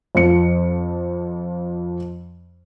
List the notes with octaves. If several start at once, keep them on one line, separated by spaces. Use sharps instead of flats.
F2 F3 C#7